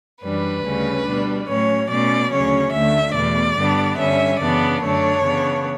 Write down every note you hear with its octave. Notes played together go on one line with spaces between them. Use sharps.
F#2 E3 G3 D4 B4
D2 C#3 G3 C#4
B2 G3 D4
A2 F#3 A3 C#4 C#5
B2 A3 C#4 D5
D2 C#3 F#3 C#4 C#5
D2 D3 A3 E5
E2 B2 A3 D5
G2 D3 G3 B3 D4
G2 D3 G3 C#4 E5
F#2 C#3 E3 B3 D4 D5
F#2 D3 F#3 A3 D4 C#5
C#3 E3 B3 D4